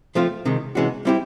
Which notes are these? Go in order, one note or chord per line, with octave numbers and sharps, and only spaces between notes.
F3 A3 C4 F4
C3 D#3 G#3
C3 E3 G#3 C#4 F#4
G3 C4 E4 G4